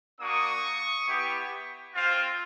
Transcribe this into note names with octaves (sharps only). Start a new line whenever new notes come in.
A#3 D4 F#4 C#6 D#6
B3 E4 G4
C4 F4